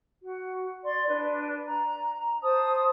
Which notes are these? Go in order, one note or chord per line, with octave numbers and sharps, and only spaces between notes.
F#4
D5 C6
D4 B4
A#5
C5 A5 D#6